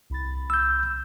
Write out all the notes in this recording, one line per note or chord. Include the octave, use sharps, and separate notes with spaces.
C2 B5 A6
E6 G6